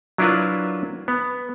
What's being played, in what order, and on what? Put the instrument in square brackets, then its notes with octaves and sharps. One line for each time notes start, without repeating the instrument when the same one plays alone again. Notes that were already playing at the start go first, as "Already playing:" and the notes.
[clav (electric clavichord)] F#3 D4 E4 F4 A#4 B4
B3